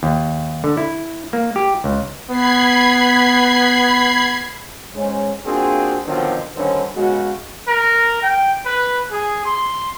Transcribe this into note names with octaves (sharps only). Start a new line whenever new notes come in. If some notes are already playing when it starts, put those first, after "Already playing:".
D#2
D3
E4
A#3
G4
C#2
B3 B5 G#6 C7
G#2 G#3 C#4
A#3 C4 D4 F4 F#4 G#4
B2 D3 D#3 F3 F#3 C4
G2 D3 D#3 G3 C4 C#4
B1 C#3 G#3 F#4
A#4
G5
B4
G#4
C6